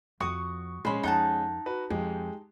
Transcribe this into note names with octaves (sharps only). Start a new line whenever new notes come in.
F2 F3 F#4 C#6 D#6
A#1 G#3 C#4 C5 B5
F2 D#4 F#5 A5
F#4 B4
F2 G#3 G4